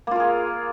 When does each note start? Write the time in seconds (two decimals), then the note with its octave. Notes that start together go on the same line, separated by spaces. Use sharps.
0.07 A#3
0.11 F4
0.16 A#4
0.20 G#4